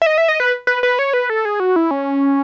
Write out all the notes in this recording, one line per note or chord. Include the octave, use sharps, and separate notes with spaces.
E5
D#5
E5
D#5
B4
B4
B4
C#5
B4
A4
G#4
F#4
E4
C#4